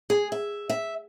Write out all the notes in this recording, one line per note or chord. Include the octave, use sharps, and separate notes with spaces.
G#4
E5
E5